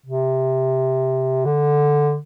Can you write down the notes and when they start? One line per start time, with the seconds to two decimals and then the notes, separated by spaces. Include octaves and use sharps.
0.06 C3
1.45 D3